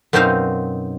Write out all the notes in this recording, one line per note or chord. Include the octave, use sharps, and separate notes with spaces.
F#2 B2 C4 D#4 C5 F5